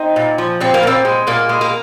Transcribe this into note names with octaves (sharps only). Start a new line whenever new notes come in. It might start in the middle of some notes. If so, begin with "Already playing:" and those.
Already playing: C4 D#4
A#2
F3
A#2 C4
A#3
A#2 C4
G#3
A#2 A#3
G#3
A#3